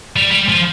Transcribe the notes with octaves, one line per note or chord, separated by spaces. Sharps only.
G3
G3
F3